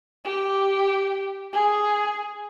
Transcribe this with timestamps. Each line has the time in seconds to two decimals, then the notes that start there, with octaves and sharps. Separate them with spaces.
0.25 G4
1.53 G#4